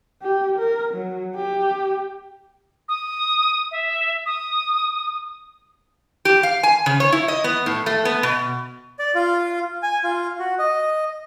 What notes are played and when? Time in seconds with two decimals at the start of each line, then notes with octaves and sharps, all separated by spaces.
0.22 G4
0.59 A#4
0.94 F#3
1.35 G4
2.88 D#6
3.71 E5
4.26 D#6
6.25 G4
6.43 F5
6.63 G#5
6.86 C#3
7.00 C#5
7.12 E4
7.28 D#5
7.44 B3
7.66 A2
7.86 A3
8.05 B3
8.23 B2
8.99 D5
9.15 F4
9.83 G#5
10.04 F4
10.39 F#4
10.59 D#5